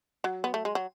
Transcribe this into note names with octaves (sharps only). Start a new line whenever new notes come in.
F#3
B3
A3
G#3
F#3